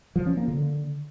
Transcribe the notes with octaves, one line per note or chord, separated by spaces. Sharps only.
F3
C#4
A#3
D3